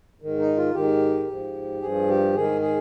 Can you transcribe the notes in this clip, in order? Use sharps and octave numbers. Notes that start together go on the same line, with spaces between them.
G#2 D#3
D#4
F4
G#2 D#3 G4
G#2 F3
G2 F3 G#4
G4
G#2 D#3 G#4
G#4